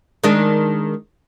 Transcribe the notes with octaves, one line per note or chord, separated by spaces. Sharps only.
D#3 G#3 D4